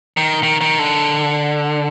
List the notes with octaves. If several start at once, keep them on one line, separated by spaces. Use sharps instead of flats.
D#3
D#3
D#3
D3